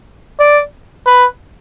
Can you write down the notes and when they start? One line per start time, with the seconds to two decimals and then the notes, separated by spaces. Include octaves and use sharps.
0.40 D5
1.06 B4